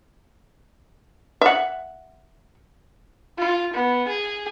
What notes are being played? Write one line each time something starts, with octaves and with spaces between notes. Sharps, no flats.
E5 F#5
F4
B3
G#4